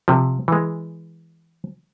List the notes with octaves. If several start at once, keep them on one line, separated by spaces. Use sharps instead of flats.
C3 F3
E3 G#3